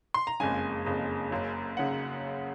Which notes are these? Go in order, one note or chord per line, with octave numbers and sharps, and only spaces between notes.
C6
A#5
F#1 F2 C#3 G#3 G#5
F#1 F2 C#3 G#3
F#1 F#2 C#3
C#3 F#5